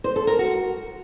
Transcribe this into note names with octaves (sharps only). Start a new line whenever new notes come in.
C5
A4
A#4
F#4